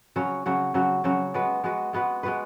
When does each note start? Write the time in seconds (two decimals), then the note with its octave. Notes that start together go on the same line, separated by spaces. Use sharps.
0.16 C#3 F#3 C#4 F#4
0.46 C#3 F#3 C#4 F#4
0.74 C#3 F#3 C#4 F#4
1.04 C#3 F#3 C#4 F#4
1.34 G#3 B3 F#4 B4
1.64 G#3 B3 F#4 B4
1.93 G#3 B3 F#4 B4
2.23 G#3 B3 F#4 B4